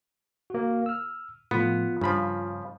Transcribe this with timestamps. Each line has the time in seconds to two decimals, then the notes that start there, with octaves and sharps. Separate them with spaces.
0.50 A#3 F#4
0.86 E6 F6
1.51 A2 F3 B3 F4
2.01 G2 C#3 F3 B5